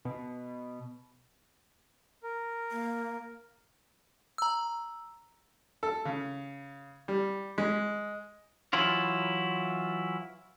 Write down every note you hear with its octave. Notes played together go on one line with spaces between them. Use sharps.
B2
A#4
A#3
A#5 E6
A4
C#3
G3
G#3
E3 F#3 E4 F4